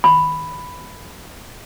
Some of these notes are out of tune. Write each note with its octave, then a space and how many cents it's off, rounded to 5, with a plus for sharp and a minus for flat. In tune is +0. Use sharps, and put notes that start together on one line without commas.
B5 +5